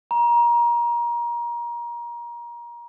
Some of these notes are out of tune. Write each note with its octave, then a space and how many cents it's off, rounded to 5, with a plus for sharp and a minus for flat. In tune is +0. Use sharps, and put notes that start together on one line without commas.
A#5 +25